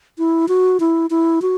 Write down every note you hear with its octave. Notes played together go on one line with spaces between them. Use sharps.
E4
F#4
E4
E4
F#4